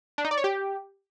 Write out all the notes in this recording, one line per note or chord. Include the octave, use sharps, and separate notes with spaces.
D4
D#4
D5
C#5
G4